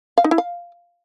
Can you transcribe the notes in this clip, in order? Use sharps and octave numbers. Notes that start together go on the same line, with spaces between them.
F5
D#4
E4
F5